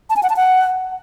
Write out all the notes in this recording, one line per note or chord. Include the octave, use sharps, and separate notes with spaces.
A5
G#5
F#5
A5
F#5